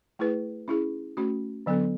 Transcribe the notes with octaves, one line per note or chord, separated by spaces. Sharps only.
A3 E4 G#4 B4
C#4 E4 G#4
A3 C#4 F#4
D3 F#3 B3 D4 A4